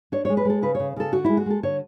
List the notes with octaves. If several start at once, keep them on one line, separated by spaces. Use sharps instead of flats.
D4 C#5
G#3 C#5
B4
G#3 A4
C#3 B4
C#3 C#5
C#3 A4
D3 F#4
G#3 E4
F#4
G#3 A4
D3 C#5